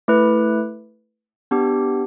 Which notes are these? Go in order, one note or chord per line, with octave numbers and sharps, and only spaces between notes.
A3 E4 B4
B3 D4 G4